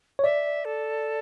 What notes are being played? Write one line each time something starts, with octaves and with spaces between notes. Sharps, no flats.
C#5
D5 E5
A4